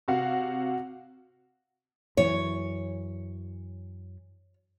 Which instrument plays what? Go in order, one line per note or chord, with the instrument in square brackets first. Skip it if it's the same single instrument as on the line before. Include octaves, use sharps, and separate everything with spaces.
[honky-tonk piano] C3 F#4 F5 F#5
[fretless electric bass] F#2 E3 [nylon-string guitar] C#5